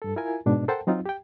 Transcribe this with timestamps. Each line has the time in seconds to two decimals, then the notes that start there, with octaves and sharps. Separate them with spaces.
0.02 G2 A4
0.16 E4 F4 A#4 G#5
0.46 G#2 B2 D4
0.68 A4 A#4 C5 F#5 G5 A5
0.87 F#3 C4 D#4 F4
1.06 G4 G5